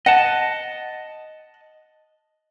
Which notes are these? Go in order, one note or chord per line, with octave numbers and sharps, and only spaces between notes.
D#5 F#5 A5